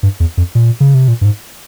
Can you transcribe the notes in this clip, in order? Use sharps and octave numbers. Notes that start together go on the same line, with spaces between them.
G2
E2
F2
A#2
C#3
C3
A#2
G2
G#2